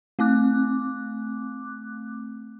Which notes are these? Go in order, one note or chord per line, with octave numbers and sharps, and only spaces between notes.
A3 C4 D6 F#6